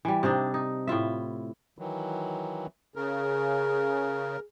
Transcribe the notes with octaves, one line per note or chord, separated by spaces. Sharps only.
E3 G3
C3 C4 D4 D#4
D#4
A2 E4 F4 E5
D#3 E3 F#3
C#3 G#4 A#4